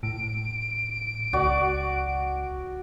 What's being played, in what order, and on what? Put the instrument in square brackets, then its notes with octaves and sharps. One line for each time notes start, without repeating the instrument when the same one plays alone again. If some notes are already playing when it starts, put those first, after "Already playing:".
[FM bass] A2 [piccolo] D7
[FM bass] C#2 [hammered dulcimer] F#4 D5